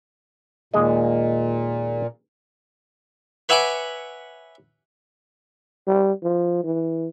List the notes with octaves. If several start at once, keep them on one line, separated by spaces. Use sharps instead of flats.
D#2 A#2 G#3 D#5
B4 C#5 E5 F#5 G#5 D6
G3
F3
E3